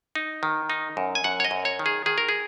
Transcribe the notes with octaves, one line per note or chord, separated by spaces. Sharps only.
D#4
D#3
D#4
F#2
G#5
F#2 F#5
C#5
D#5
F#2
C#5
D#3
G#4
D#3 G#4
A#4
G#4